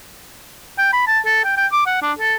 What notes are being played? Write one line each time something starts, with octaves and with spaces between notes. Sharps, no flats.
G5
B5
A5
A4
G5
G5
D6
F#5
D4
A4